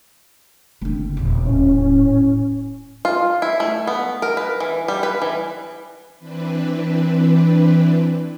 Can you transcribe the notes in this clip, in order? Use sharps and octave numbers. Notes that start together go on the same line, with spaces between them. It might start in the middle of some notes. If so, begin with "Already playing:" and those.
F#1 D3 C4
D#1 E2
A2 C#4
F4
E4
A3
B3
A#4
B4
E3
G3
B4
E3
E3 C4 D4 B4